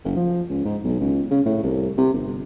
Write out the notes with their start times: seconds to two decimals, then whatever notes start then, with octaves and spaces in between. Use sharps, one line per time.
0.05 F#1
0.16 F3
0.49 C#2
0.65 G#2
0.84 B1
1.00 C#2
1.31 C#3
1.46 A2
1.63 C2
1.97 C3
2.13 G1